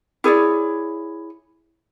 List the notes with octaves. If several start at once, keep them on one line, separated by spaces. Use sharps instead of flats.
E4 G#4 C#5 D5